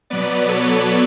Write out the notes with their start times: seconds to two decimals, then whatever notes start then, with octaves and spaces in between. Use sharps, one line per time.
0.10 B2 F#3 B3 B4 D5
0.48 A4 C#5